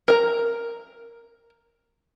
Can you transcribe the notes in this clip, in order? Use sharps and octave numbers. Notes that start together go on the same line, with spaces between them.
A#4 A#5